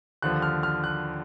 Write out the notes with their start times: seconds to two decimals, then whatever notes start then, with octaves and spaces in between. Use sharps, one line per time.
0.22 D#2 D3 F3 F#6
0.42 F6
0.63 F6
0.84 F#6